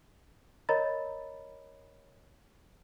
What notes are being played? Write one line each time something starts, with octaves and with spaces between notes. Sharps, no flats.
A#4 C#5 D#5 A#5 B5 A6